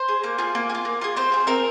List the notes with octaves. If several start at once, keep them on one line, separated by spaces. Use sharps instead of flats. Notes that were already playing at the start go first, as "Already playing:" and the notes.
Already playing: C5
G#4
A#3
F4 G#4
A#3
G#4
F4
A#3
F4 G#4
C4 C5
F4 G#4
C4 A#4